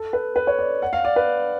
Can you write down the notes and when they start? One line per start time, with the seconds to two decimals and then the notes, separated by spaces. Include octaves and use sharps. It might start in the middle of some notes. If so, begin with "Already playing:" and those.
Already playing: A4
0.13 B4
0.36 B4
0.47 C#5
0.58 D5
0.82 F#5
0.93 F5
1.05 D5
1.16 B4